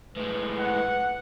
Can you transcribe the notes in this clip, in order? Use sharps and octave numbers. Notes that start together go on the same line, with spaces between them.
A2 G#3 B4
F#5